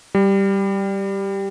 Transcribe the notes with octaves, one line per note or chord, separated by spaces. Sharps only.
G3